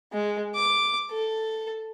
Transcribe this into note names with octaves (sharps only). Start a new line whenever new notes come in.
G#3
D6
A4